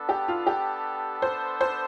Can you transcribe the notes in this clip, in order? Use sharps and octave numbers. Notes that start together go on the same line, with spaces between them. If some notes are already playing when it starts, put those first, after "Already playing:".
Already playing: B3 D4 A4
G4
F4
G4
C5
C5